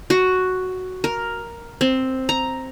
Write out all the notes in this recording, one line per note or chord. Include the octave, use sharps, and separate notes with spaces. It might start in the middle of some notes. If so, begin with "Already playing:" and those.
F#4
A#4
C4
A#5